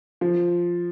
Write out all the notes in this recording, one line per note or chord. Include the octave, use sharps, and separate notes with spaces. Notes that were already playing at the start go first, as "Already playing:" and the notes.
F3